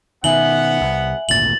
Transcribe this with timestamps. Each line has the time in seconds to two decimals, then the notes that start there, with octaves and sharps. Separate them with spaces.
0.24 B2 D#3 B3 E5 F#5 G#5 F#7 G7
0.81 C2
1.29 G#1 D2 A#2 A6 F#7